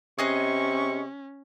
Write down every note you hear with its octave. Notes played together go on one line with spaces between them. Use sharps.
C3 C#4 G#4 D#5 C#6 F#6